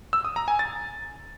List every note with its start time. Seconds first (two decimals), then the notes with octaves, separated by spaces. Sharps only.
0.13 E6
0.25 D#6
0.36 A#5
0.48 G#5
0.59 A6